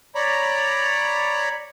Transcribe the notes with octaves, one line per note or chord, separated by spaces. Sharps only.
C#5 D5 A#5 B5